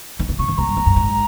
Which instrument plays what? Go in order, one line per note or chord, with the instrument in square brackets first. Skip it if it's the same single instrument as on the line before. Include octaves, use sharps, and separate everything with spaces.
[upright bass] D#3
C#3
[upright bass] C#3 [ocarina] C#6
[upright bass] D#3
[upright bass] C#3 [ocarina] A#5
[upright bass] G2
F2
G2
G#2